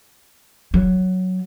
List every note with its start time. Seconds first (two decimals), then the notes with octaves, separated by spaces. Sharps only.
0.74 F#3